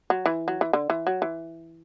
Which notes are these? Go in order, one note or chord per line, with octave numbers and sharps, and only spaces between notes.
F#3
E3
F#3
E3
D3
E3
F#3
E3